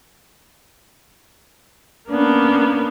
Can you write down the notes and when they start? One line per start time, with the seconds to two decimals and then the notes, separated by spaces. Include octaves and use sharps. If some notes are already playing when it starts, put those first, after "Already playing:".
2.09 A#3 B3 C#4 D4